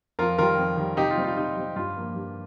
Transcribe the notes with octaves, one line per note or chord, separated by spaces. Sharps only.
F2 F4 A#4
D#3 G3 F4 A#4
F2
D#3 G3
C3 D#4 G4
F4
G3 C4
F4
C3 D#4
G3 C4
G2 F4
F3 A#3
G2